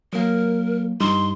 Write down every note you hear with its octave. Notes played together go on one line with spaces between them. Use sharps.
F#3 A#3 A#4
G2 D#4 C6